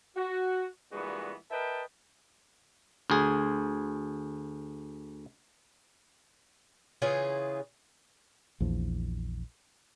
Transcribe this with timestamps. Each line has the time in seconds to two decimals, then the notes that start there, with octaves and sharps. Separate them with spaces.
0.17 F#4
0.92 G2 A#2 E3 G#3 B3 F#4
1.51 A#4 B4 D#5 E5 G5 A5
3.10 D2 G#4
7.02 C#3 E3 F4 G#4
8.60 A#1 E2 F3